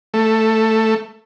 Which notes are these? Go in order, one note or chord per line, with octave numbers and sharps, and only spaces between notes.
A3